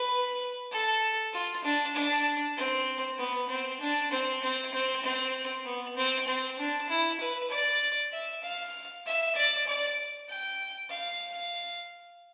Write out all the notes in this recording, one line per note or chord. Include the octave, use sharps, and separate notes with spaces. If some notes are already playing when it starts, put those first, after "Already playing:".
Already playing: B4
A4
F4
D4
D4
C4
B3
C4
D4
C4
C4
C4
C4
B3
C4
C4
D4
E4
B4
D5
E5
F5
E5
D5
D5
G5
F5